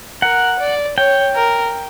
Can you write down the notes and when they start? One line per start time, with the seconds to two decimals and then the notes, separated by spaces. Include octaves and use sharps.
0.22 A#4 F#5
0.60 D5
0.97 C#5 G5
1.35 A#4